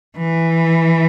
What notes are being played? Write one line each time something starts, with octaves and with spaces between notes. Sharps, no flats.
E3